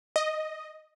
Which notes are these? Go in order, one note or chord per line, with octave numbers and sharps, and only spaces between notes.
D#5